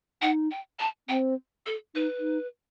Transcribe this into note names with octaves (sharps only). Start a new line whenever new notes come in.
D#4 F#5
G5
A5
C4 G5
A4
D#4 B4
D#4